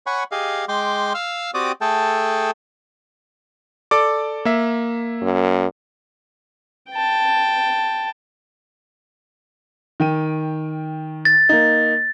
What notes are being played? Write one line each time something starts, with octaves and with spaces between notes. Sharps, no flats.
C#5 F#5 G#5 B5 C#6
G4 G#4 D#5 F5
G#3 G5 C6 D6
F5 E6 F6
C4 F#4 G4 D5 D6 D#6
A3 G#4 A4 G5 A5
A4 D5 D6
A#3 E5
F#2
G5 A5
D#3 G5 D#7
A6
A#3 D#4